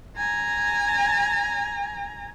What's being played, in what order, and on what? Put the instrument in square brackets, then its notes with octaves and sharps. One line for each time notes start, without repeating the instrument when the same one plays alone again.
[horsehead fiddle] G#5 A#5